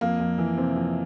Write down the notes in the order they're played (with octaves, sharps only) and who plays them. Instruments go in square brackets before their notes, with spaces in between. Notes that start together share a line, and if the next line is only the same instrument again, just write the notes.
[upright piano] F2 A#3
F2
E3
C3 C4
F2